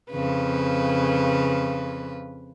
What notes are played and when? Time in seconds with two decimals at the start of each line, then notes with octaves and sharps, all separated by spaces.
0.12 F2 C#3 B4